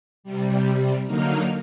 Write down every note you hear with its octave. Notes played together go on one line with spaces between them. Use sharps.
C3 G3
D3 F#3 A#3 D#4 F6